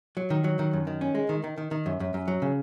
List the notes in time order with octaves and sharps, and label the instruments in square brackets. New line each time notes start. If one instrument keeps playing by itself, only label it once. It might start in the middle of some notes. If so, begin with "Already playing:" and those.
[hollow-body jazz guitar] F#3
D#3
F#3
D#3
F#2
D#3
C#4
G#3
D#3
D#3
D#3
D#3
F#2
F#2
F#2
F#3
C#3